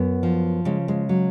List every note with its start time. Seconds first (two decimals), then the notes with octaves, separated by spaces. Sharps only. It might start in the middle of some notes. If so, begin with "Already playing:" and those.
Already playing: F#2 B3
0.23 F3
0.65 C#3 G#3
0.88 G#3
1.09 F#3